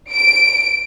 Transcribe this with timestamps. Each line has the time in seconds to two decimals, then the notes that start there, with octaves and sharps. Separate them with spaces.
0.11 D7